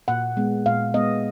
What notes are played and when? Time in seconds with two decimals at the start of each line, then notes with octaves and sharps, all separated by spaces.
0.08 A#2 F#5
0.37 G#3 B3
0.66 A#2 F5
0.94 G#3 B3 D#5